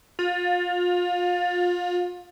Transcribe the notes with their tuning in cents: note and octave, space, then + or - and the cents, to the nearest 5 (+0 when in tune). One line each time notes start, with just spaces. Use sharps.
F4 +25